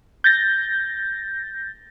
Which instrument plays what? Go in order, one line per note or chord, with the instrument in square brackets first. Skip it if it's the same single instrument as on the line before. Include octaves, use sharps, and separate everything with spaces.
[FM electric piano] G6 A6 A#6